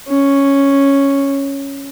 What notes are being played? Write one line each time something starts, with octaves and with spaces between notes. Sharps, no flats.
C#4